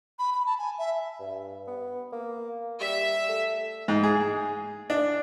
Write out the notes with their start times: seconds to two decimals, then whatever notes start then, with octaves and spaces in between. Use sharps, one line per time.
0.19 B5
0.33 B5
0.46 A5
0.59 G#5
0.78 E5
1.19 G2
1.67 B3
2.12 A#3
2.81 G3 E5
3.29 A3
3.88 G#2
4.03 G#4
4.90 D4